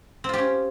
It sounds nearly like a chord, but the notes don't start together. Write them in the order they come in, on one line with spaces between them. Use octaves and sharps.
C4 F4 G4 C#4